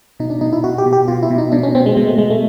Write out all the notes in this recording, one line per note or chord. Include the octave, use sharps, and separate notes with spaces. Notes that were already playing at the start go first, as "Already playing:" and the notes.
B2 D#4
D4
B2 D#4
E4
B2 F#4
G4
B2
G4
B2 F4
E4
B2
D#4
B2 D4
C#4
B2 C4
G#3
B2 G#3
A3
B2 G#3
A3